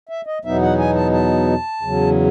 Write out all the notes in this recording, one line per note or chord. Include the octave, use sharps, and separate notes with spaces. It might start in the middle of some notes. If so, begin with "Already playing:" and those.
E5
D#5
E2 B2 F#3 B3 D#4 E5
F#5
G#5
A5
A5
E2 C#3 F#3